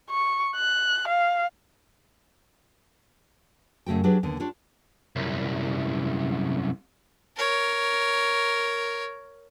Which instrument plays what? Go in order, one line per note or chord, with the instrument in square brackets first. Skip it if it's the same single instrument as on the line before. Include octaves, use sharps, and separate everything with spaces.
[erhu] C#6
F#6
F5
[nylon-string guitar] F#2 C#3 A3 F#4 G5
F#3 D4 G4 G#4 B4
D#2 D3 B3
D4 F4 G4 C#5
[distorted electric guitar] C2 F#2
[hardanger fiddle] A#4 C#5